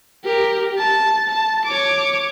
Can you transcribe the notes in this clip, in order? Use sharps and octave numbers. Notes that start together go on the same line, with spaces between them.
G4 A#4
A5
A5
C#5 D6